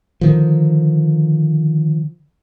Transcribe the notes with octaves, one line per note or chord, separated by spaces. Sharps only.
D3 D#3 F3